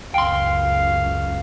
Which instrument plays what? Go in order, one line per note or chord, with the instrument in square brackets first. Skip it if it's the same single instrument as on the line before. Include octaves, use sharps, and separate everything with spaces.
[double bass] C#2 F#2 [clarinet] F5 [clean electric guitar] G5 C6